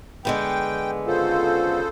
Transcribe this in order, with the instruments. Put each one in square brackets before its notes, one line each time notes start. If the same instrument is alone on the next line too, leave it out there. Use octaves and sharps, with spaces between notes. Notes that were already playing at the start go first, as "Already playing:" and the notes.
[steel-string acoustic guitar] D3 G#3 B3 [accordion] G5
[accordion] C#3 A4 C5 [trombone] F4